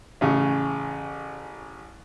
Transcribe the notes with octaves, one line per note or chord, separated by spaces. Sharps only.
A1 C#3